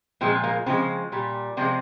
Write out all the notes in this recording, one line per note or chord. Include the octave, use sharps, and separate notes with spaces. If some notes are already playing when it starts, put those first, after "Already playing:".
A#2 F3 G#3 C4
A#3
C#3 F3 G#3 C4
A#2 G3
C3 F3 G#3 C4